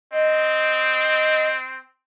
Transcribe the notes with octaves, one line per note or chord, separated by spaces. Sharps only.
C4 D#5